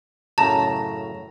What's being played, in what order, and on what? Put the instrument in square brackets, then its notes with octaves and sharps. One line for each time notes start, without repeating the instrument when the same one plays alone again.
[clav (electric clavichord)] F#2 A2 C#3 [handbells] A5 [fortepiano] A#5